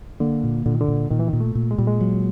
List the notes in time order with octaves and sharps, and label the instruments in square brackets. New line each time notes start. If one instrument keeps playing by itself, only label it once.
[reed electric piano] D3 [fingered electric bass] A#3
[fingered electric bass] A#2
[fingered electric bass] A#2 [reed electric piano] D3
[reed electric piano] D#3
D3
[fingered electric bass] A#2
[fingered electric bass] A#2 [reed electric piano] D#3
[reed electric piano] E3
D#3
[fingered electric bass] A#2
[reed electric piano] A3
[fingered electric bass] A#2
[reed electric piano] G#3
[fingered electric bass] A#2 [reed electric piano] G3
[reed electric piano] G#3
[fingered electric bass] F#3